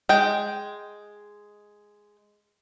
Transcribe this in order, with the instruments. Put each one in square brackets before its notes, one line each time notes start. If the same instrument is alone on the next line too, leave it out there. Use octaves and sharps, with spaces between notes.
[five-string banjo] G#3 G5